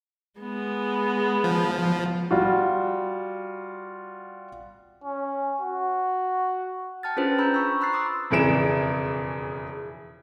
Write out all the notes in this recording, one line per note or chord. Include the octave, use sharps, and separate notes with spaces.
G#3 B3
F3
G3 F4 F#4
C#4
F#4
G5 A5 F6 A6
C#4 D4 F4 G#4 B4 C5
A#5 B5 E6 G6
C#6 E6
A#5 B5 E6 F#6 A6 C7
C6 D6 D#6
E1 F2 C#3 E3 D7 E7